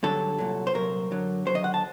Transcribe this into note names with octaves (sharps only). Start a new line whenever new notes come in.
G2 D3 F#3 A4
C2 A#2 F#3
C5
C2 A#2 F#3 A#4
F#2 D3 F#3
D#2 D3 F#3 C5
D#5
F#5
A5